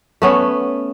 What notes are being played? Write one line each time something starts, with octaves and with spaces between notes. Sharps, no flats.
A3 B3 C#4